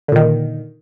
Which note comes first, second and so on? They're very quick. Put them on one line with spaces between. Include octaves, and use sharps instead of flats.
D3 A#2 D#3